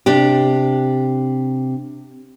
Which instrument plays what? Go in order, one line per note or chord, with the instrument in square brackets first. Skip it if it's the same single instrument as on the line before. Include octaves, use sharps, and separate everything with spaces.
[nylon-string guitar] C3 D4 G4